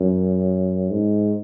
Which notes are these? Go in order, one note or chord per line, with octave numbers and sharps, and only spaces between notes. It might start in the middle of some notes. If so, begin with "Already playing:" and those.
Already playing: F#2
G#2